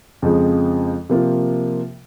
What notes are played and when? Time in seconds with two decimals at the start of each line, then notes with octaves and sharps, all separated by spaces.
0.22 F2 C#3 F3 G#3 C4
1.09 C3 F3 A#3 F4